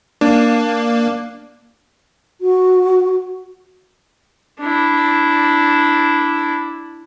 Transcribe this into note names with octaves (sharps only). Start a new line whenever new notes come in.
A#3 D4
F#4
D4 E4